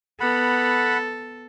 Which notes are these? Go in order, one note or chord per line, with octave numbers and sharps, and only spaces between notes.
B3 A4 F#5 B5